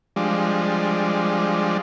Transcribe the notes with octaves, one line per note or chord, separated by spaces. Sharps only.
F3 G3 G#3 D4